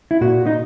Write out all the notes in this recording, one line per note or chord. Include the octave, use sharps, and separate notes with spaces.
E4
A#2 F#4
D#4